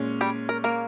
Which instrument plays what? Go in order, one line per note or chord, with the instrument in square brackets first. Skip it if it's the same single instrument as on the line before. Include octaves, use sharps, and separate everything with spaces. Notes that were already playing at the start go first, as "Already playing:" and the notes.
Already playing: [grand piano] A#2 G#3 C#4
[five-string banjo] G3 G4
A#4
A#3 A#4